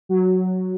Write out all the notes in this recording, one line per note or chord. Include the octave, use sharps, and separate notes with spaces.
F#3